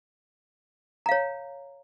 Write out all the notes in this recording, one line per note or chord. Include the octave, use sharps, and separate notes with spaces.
C#5 F5 A#5